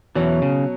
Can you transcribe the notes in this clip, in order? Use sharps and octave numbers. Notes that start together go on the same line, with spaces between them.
E2 B2 E3 F#3 C#4
C#3